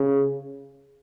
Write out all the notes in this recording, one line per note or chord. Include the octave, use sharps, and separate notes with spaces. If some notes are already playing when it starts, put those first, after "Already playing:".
Already playing: C#3